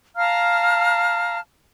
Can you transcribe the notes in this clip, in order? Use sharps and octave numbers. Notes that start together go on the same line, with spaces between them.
F5 A5 A#5 F6